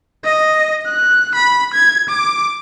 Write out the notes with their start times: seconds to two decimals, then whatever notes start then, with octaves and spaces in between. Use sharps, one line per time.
0.24 D#5
0.87 F#6
1.35 B5
1.74 G#6
2.09 D6